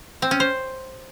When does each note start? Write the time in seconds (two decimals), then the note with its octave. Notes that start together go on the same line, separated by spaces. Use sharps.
0.22 C4
0.31 C#4
0.40 C5